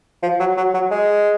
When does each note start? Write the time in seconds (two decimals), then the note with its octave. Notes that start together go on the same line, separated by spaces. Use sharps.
0.23 F3
0.40 F#3
0.57 F#3
0.74 F#3
0.91 G#3